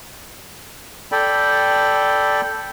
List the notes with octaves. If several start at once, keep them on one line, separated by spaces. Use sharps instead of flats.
A4 D5 G5 B5